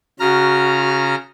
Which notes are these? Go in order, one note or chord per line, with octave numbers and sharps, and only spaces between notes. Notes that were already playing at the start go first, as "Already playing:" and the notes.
C#3 F#4 A#5 F6